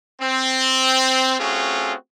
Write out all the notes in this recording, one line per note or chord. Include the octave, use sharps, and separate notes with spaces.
C4
A3 C4 C#4 F4 F#4 G#4